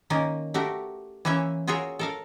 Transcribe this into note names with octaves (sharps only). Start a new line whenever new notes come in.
D#3 A#3 C#4 A#4
A3 F#4 G4 A#4
E3 A#3 C#4 C#5 E5
F4 F#4 G#4 A#4 C#5 E5
A4 A#4 F5